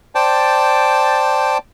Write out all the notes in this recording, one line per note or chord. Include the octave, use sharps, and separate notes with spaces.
C5 D5 G5 A5